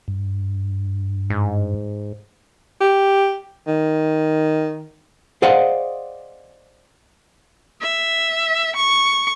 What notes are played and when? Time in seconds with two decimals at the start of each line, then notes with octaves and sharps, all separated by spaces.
0.08 G2
1.30 G#2
2.81 G4
3.67 D#3
5.42 G#4 C5 D5 D#5 F5 F#5
7.81 E5
8.76 C#6